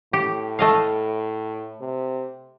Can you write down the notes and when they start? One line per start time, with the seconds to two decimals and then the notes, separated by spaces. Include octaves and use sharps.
0.13 A2 G4
0.59 A3 D#5 F5
1.81 C3